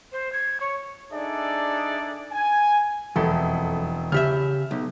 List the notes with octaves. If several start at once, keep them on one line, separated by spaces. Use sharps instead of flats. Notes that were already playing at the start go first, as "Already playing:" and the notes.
C5
G#6
C#5
D4 D#4 G#4 A4 D5 E5
G#5
E1 F2 E4 A4
C#3 G4 E5 F6
B1